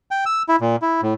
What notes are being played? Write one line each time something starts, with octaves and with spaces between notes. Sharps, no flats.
G5
E6
E4
A#2
E4
A2